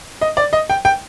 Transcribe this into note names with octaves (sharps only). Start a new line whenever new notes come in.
D#5
D5
D#5
G5
G5